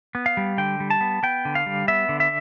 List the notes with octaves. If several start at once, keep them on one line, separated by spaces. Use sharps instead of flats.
B3
F5
G3
D3 G5
G3
A5
B3
B3 G5
D3
F5
G3
B3 E5
D3
E5